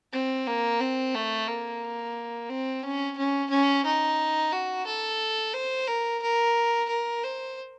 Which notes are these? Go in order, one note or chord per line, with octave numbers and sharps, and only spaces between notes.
C4
A#3
C4
A3
A#3
C4
C#4
C#4
C#4
D#4
F#4
A4
C5
A#4
A#4
A#4
C5